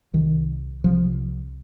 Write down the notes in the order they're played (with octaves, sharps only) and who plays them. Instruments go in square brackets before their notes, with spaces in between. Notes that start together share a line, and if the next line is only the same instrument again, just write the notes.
[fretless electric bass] C2 C3 D#3
C2 C3 F3